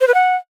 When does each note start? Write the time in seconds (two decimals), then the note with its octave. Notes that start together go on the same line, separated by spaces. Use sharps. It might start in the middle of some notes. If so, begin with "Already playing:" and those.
0.01 C5
0.08 B4
0.14 F#5